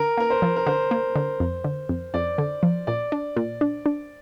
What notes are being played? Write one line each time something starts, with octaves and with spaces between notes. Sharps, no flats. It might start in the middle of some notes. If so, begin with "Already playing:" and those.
Already playing: D3 A#4
A#3 A#4
C5
F3
A#4
D3 C5
A#3
D3
F2
D3
F2
F2 D5
D3
F3
A#2 D5
D4
A#2
D4
D4